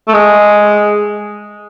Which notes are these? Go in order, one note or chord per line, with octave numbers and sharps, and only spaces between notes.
A3
G#3